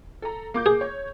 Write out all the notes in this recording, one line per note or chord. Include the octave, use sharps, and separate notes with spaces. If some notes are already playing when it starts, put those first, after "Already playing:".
A4 A#5
A#3 D6 G6
G#4
C#5